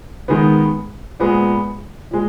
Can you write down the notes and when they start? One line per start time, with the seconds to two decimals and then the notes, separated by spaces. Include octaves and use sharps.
0.28 D#3 G#3 B3
1.19 A#2 G#3 B3
2.11 A#2 G#3